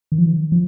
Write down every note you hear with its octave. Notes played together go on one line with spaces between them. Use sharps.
D#3
F3
D#3
F3